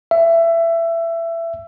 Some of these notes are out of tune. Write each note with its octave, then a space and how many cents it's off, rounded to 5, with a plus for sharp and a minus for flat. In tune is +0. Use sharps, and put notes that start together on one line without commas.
E5 +20